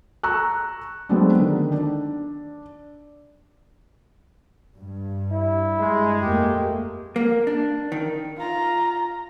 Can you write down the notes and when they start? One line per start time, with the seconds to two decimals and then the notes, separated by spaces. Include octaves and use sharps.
0.23 A#5 C#6 E6 F#6
1.09 F#3 G#3 A3 B3 C4 D4
1.39 D3 D#3
1.72 D4
4.76 G2
5.32 E4
5.79 G#3
6.22 F2 A3 A#3 G4
7.16 A#3
7.47 D4
7.92 D#3
8.37 F4 A#5